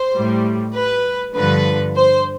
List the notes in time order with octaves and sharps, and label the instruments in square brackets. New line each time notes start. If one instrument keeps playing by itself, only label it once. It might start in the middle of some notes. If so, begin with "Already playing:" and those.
Already playing: [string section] C5
A2 G3
B4
G2 D3 F3 B4
C5